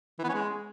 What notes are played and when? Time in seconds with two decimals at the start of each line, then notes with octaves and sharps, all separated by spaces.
0.19 E3
0.24 B3
0.29 C#4
0.34 G#3